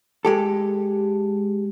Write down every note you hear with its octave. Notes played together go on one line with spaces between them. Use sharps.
G#3 G4 A4